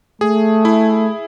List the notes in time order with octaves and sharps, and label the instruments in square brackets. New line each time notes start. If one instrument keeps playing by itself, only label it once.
[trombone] A3 [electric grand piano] G#4
[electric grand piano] E4